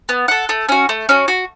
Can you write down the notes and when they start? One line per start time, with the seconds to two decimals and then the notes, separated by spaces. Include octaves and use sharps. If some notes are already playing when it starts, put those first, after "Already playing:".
0.09 B3
0.28 A4 F#5
0.49 A3
0.69 C#4 F#4
0.89 A3
1.09 C#4 F#4
1.28 F#4